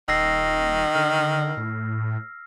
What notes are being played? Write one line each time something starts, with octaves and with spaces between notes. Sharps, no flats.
D#1 D#3 E6 A#6 C7
D3 F6
A2